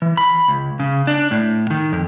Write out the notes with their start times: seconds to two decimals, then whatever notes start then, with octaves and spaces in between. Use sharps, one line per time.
0.02 E3
0.17 B5
0.48 C#2
0.80 C#3
1.07 D4
1.31 A2
1.70 D#3
1.92 F2